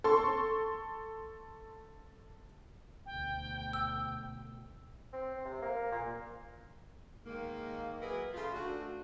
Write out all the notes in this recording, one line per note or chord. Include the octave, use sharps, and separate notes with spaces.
A4 C6 C#6
D2 B2 G5
E6
C4
C3
A#3
A#2
G#2 D#3 A#3
F#3 E4 G#4 A#4 B4
C#3 A3 F4
A3 D4 F#4